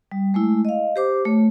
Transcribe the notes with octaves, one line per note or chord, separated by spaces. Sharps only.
G3
G#3 A3 E4
D#5 F5
G4 C5 D6
A3 C#5